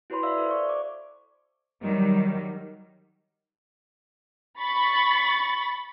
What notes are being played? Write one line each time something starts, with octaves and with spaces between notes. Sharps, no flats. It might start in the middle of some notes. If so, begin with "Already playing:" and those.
E4 F#4 B4 C#5 B5 C6
D5 E5 F5 E6
A4 C5
D5 C#6
D6
D#3 F#3 G3
B5 C#6 A6